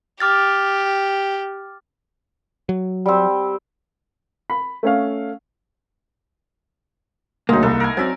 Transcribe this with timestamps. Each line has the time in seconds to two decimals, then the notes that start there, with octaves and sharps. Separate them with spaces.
0.20 G4 D6 F6 A6
2.69 F#3
3.06 G3 C4
4.50 B5
4.83 A3 C#4 F5
7.49 D2 F#3 G#3 A#3 D#4
7.63 C2 A4
7.80 A#4 G#5
7.97 F#3 C4 D5 E5 G#5